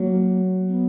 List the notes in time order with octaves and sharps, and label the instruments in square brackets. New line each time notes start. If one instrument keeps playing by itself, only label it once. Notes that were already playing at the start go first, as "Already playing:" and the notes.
Already playing: [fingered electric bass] F#3 [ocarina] A#3
[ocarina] B3